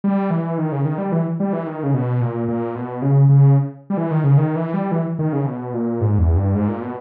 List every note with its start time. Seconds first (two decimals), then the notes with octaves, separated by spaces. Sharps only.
0.04 G3
0.30 E3
0.58 D#3
0.72 C#3
0.85 D#3
0.98 G3
1.12 E3
1.40 G3
1.53 E3
1.67 D#3
1.83 C#3
1.94 B2
2.21 A#2
2.48 A#2
2.75 B2
3.02 C#3
3.29 C#3
3.90 G3
3.97 E3
4.11 D#3
4.24 C#3
4.37 D#3
4.56 E3
4.74 G3
4.92 E3
5.19 D#3
5.33 C#3
5.46 B2
5.74 A#2
6.01 G#2
6.18 E2
6.36 G2
6.55 G#2
6.68 A#2
6.82 B2